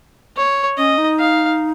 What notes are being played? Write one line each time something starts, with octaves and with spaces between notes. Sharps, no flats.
C#5
C#4 D#5
D#4
F5